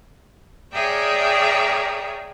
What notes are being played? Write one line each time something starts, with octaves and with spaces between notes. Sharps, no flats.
G#4 A#4 C#5 D5 E5 G5